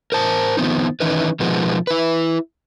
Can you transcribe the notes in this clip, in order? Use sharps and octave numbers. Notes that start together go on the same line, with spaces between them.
A#4 C5 A5
D#3 F3 B3 C4 D#4
D#3 E3 C#4 D#4 B4
B2 D#3 F3 G#3 B3
E4 B4